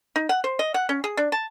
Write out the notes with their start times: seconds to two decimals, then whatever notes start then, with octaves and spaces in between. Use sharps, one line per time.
0.16 D#4
0.29 F#5
0.44 C5
0.59 D#5
0.74 F#5
0.89 C#4
1.04 G#4
1.17 D4
1.32 A5